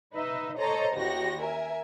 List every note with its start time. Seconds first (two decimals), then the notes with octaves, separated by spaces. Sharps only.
0.13 D#4 B4 D#5 E5
0.58 A4 C5 C#5 D#5 A#5
0.96 A1 D#2 F#4 G4 A#6
1.41 A#4 E5 G#5